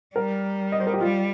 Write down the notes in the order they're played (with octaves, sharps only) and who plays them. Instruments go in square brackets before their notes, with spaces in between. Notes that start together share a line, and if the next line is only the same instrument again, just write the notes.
[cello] G3 [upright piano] A#4
[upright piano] D#5
C5
A#4
G4
[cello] G3 [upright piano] F4